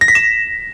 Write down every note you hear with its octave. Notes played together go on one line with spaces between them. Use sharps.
A#6
B6
E7